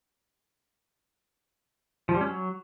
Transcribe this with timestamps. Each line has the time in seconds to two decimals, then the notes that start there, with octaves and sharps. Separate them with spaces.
2.09 F3
2.15 G3
2.21 C#4
2.27 F#3